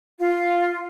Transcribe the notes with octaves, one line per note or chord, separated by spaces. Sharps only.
F4